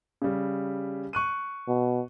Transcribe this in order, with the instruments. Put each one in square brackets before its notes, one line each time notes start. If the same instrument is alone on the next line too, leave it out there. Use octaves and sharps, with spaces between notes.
[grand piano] C#3 G3
C#6 F#6 D#7
[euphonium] B2